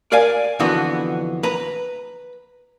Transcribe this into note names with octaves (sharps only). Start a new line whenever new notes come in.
A#4 D5 F5 G#5
F2 D3 E3 B3 F#4
B4 A#5